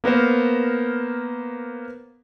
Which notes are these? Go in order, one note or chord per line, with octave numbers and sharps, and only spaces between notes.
A#3 B3 A#4 C5